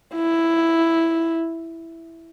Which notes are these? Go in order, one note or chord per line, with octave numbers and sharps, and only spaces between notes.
E4